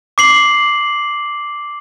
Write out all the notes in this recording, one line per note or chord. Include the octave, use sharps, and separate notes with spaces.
D6 C7 F#7